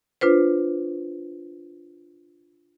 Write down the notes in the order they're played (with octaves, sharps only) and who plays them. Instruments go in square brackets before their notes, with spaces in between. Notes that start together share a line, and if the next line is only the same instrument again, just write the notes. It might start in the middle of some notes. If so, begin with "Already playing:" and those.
[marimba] D4 F4 B4 C5